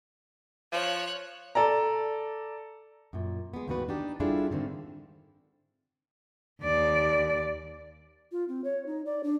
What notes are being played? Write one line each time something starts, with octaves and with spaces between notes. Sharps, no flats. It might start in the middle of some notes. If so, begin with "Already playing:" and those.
F3 C#5 F#6
A4 D5 A#5
F#2 A#2
G#3 B3
D#2 G#2 G3 B3 F#4 B4
D4 D#4 G4
G3 D4 E4 F4 G#4 A4
G#2 D3 D#3 C4
D#2 D5
F4
C4
C#5
D#4
D5
D4